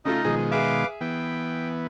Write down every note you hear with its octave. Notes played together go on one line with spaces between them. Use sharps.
C#3 A3 D#4 F4 D#5
B2 D#3 F3 G#3 G#4
G#4 B4 E5 F5 D6
E3 B3 G5